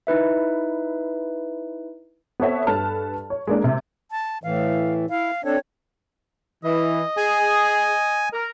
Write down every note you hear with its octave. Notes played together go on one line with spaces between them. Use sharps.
D#4 E4 B4 E5
B3 C4 A4 C#5 E5 F#5
G2 A4 B4 A5 F6
C#5
G#3 A#3 D4
C3
A5
A2 E3 F5
E4 F5
C4 D4 A4 C#5
E3 D#5
G#4 G#5
A#4